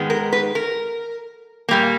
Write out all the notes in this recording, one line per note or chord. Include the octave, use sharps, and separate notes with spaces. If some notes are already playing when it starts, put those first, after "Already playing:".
Already playing: G#2 D#3 G#3 B3
A#4
B4
A#4
A#2 G3 A#3